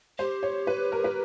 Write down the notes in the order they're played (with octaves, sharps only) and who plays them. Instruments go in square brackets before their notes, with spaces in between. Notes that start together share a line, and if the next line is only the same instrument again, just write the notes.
[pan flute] G4 [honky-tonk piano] C5
[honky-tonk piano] C#5
B4
A#4
B4